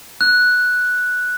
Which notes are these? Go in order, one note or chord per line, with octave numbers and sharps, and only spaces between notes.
F#6